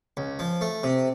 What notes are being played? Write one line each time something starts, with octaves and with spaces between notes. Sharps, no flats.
C#2
F3
A3
C3